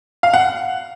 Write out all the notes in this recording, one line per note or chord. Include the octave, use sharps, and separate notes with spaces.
F5
F#5